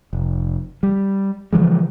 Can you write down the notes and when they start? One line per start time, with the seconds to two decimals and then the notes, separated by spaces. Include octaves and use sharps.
0.13 F1
0.83 G3
1.53 C#3 E3 F3 G#3